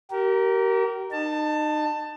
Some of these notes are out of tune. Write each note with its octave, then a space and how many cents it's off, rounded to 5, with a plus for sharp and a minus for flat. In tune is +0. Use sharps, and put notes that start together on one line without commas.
G4 -35 A#4 +0
D#4 -30 A5 +15